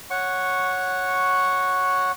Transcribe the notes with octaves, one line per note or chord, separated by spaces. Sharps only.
C#5 F#5 C#6